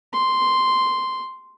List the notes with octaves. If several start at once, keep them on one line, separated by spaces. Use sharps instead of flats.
C6